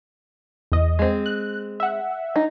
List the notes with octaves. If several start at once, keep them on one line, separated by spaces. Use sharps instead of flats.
E2 D#5
G#3 C4
F#6
E5 F#5
D#4